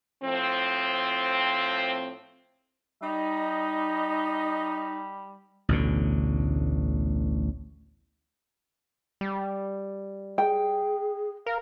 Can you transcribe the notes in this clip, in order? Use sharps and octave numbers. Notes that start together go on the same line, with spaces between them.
A2 F3 C4
G3 D#4 D#5
A1 D2 B2 D3
G3
G#4 G5
A#4 F5